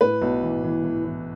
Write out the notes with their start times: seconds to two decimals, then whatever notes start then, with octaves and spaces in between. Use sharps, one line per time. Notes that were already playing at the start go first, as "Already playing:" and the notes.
0.01 A2 B4
0.22 B1
0.43 E3
0.64 E3
0.84 E3
1.05 E3